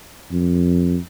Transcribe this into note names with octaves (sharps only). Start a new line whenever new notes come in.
F2